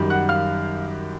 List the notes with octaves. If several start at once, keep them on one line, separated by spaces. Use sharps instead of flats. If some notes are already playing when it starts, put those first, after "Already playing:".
Already playing: F#2 D#3 G3
F#5 F#6
F5 F6